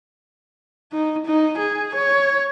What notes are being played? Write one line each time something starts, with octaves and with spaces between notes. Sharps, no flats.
D#4
D#4
G#4
C#5